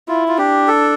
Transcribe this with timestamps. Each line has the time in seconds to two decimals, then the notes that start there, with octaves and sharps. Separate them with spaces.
0.08 E4 F4
0.28 F4
0.38 D4 G4
0.68 A4